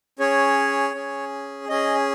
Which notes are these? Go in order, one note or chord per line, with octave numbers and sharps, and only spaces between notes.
C#4 G#4 C#5
C#4 G#4
C#4 G#4 D#5